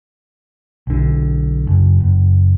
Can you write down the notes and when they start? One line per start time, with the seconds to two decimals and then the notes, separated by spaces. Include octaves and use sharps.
0.87 B1 D3
1.67 F#1
2.00 F#1